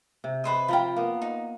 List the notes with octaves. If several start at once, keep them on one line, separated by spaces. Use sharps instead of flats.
C3
B4 C5 D#5
F3 F4 G5 A#5 B5
A#3 B3
D#4